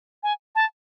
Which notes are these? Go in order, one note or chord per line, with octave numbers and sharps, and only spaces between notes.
G#5
A5